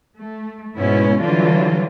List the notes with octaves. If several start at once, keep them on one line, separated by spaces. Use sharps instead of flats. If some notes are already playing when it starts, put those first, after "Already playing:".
A3
G#2 B2 G#3 B3 C#4 E4
D3 E3 F#3 G3 D4 F4